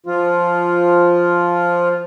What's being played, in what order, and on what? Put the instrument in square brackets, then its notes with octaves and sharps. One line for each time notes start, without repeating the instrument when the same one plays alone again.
[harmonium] F3 F4